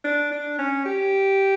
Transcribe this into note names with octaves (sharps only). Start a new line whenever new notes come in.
D4
D4
C#4
G4